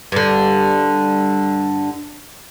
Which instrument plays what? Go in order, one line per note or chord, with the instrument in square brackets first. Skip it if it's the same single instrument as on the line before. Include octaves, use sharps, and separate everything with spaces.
[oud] G2 D3